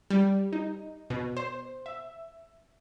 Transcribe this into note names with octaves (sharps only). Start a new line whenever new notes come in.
G3
D#4
B2
C5
E5